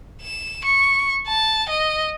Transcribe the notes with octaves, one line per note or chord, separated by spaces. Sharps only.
E7
C#6
A5
D#5